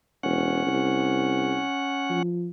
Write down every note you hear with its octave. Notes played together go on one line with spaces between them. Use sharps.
E1 C#4 F#5
C2
F3